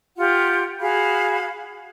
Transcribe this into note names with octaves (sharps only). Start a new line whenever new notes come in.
F4 G4 F#5
F#4 G#4 F5 B5